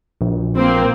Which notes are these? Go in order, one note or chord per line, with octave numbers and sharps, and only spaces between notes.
A#1
A#3 C4